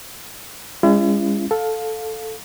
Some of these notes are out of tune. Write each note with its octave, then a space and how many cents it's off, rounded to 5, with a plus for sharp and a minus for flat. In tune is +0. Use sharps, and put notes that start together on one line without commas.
G#3 -30 C#4 +5 E4 +45
A4 +0 F5 +20